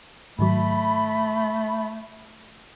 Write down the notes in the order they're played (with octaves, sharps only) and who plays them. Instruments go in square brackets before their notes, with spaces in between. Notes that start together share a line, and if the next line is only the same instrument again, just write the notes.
[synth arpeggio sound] G#2 D#3 F#3 [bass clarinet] A3 [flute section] B5